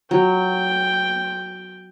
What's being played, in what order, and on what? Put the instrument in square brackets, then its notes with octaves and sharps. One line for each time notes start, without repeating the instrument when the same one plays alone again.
[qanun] F#3 [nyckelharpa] G5